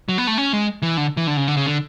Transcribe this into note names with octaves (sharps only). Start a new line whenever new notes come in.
F#3
B3
A3
C#4
G#3
E3
D3
E3
D3
C#3
D3
C#3
D3